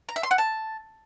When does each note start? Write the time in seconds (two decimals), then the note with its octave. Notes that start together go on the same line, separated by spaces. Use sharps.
0.09 A#5
0.16 E5
0.23 C6
0.31 F#5
0.38 A5